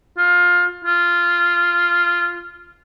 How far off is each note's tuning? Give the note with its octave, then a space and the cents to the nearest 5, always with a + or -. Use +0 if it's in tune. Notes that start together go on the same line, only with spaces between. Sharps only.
F4 +20
F4 -10